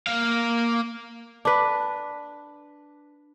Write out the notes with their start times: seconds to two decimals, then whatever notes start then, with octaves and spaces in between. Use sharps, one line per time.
0.07 A#3 F5
1.45 D4 B4